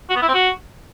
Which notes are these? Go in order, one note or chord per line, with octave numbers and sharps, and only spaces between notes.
F#4
B3
E4
C4
F#4